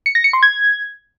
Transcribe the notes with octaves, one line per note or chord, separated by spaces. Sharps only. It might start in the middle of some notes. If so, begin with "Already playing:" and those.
C#7
A#6
C#7
C6
G#6